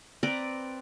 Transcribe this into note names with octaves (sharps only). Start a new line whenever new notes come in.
C4 B4 D5 A#5